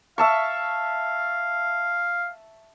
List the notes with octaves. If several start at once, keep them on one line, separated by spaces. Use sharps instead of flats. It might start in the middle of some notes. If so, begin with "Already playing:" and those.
E5 F5 A5 C#6